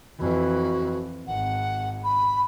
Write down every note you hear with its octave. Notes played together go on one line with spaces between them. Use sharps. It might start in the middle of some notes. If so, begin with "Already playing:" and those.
F2 E3 F#4
G#1 F#5
B5